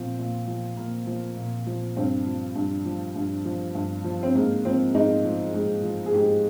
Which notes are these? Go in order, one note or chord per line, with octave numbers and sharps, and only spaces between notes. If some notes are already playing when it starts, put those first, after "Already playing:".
Already playing: A#2 F3 C4
A#2
F3
A#2 A#3
F3
A#2
F3
G2 C4
F3
G2
F3
G2
F3
G2
F3
C4
G#2 A#3
F3 C4
G#2 D#4
F3
G#2
F3
G#4
G#2 G4